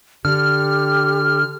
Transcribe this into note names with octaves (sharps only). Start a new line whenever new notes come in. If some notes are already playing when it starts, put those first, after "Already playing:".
D3 G4 F6